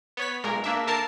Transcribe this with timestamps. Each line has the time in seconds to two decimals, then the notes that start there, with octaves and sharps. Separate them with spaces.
0.17 B3 C#5 B6
0.44 B1 A#2 G#3 A#4
0.64 A#3 D4 E5
0.87 D3 A#4 A5 A6 C7